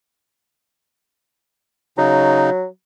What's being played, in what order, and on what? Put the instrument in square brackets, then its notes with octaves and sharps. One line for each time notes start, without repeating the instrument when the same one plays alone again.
[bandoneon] C#3 D#4 [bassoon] F#3